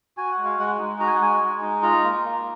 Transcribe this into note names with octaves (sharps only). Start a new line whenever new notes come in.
F#4 G#5
F#5
G#3
F5
G#3 F#5
D#4
F#4 A#5
G#5
F#5
G#3 G#5
G#3
D#4
F4 A#5
A#3
A#3